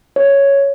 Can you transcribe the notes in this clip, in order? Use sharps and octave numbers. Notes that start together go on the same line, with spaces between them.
C#5